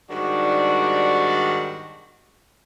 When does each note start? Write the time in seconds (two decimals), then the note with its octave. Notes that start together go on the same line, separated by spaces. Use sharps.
0.10 G#2 D#3 G3 D4 F#4